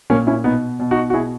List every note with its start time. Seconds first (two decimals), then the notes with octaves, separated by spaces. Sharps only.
0.10 A#2 A#3 C#4
0.27 C#4 E4
0.44 B2 B3 D#4
0.80 B2
0.91 D#4 F#4
1.10 F#4
1.13 B2 E4 G#4